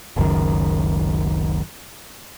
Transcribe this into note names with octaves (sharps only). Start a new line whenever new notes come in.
F#1 C#2 F#2 D#3